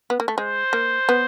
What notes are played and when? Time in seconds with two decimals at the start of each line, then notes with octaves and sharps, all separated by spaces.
0.10 B3
0.20 A#3
0.28 A3
0.38 G#3 C5
0.73 A#3
1.09 B3